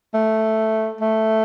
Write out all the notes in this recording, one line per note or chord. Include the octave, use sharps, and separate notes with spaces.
A3
A3